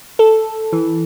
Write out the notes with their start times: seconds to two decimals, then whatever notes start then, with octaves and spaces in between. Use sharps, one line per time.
0.19 A4
0.73 E3